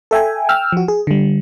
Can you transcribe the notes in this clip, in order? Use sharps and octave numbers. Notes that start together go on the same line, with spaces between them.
A4 E5 G5 G#5
G5 E6 F6
F3 F#4
G#4
D3 G3